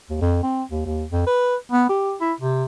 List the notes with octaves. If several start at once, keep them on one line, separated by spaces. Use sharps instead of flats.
D#2
F2
C4
D#2
D#2
F2
B4
B3
G4
E4
C3